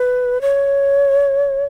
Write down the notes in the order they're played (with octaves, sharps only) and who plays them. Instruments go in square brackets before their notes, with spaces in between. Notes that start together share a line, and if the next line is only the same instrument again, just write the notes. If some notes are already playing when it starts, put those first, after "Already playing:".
Already playing: [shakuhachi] B4
C#5